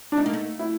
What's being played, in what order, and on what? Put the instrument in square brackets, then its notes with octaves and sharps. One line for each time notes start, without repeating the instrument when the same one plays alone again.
[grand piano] D4
[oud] A3 [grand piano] D#4
[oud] A#3
A3
[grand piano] E4